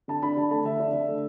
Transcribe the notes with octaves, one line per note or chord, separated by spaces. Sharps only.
D3 A5
D4 B5
D3 A5
A3 A5
D3 E5
D4
D3
A3